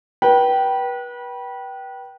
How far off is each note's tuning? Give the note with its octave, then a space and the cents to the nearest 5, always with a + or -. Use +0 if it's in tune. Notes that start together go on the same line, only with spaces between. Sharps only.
B4 -30 G5 -20